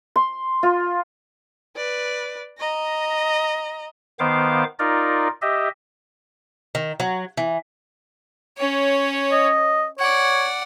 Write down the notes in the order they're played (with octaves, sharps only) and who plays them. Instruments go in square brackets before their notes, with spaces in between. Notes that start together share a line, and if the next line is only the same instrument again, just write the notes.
[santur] C6
F4
[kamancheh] B4 D5
D#5 A#5
[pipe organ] D#3 B3 C5 F5 D6
D#4 F4 A#4 D5
G4 D#5 E5
[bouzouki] D#3
F#3
E3
[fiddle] C#4 C#5
[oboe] D#5
[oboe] C#5 [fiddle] D5 F#5